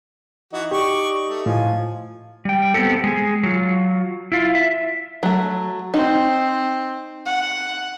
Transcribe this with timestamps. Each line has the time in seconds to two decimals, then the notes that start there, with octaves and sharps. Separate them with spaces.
0.53 E3 D#4 F#4
0.72 G4 D5 C#6
1.28 A3
1.46 A2 F3 G#5
2.45 G3 G5
2.74 B3 C4 G4 A4
3.04 G#3 G#4
3.43 F#3 F4
4.32 E4 F4
4.55 E5
5.23 F#3 A3
5.94 C4 D#4
7.26 F#5